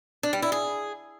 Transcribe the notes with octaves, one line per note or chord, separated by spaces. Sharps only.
D4
G3
E4
G#4